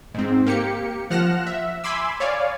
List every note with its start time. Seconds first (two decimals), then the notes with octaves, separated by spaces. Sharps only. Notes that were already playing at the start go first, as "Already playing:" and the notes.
0.14 G#2 C4
0.46 A#3 G4 C#7
1.10 F3 F#5 F6 F#6 A#6 E7
1.47 E5
1.84 G#5 B5 C6 D6 E6
2.20 C#5 D5 F5 G#5